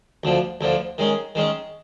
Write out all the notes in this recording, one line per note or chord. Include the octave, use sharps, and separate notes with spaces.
D2 D3 F3
D2 D3 F3
D#3 G#3 C#4
D#3 G#3 C#4